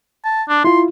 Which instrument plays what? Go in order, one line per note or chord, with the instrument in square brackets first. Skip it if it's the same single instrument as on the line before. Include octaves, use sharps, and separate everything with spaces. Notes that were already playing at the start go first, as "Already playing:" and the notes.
[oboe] A5
D4
[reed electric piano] E4 F4 [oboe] C6